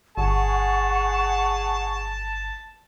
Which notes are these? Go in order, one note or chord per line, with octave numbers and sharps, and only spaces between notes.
G1 G#4 F#5 A5 C#6